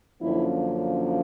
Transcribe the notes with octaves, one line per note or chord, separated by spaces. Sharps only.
F#2 D3 F3 A#3 C#4 E4